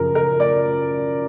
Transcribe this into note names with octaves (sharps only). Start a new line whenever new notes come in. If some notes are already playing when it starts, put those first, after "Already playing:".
Already playing: F#2 C#3 F3 A#4
A#4
D5